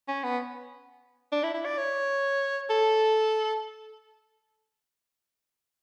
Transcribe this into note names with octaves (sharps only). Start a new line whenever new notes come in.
C#4
B3
D4
E4
E4
D5
C#5
A4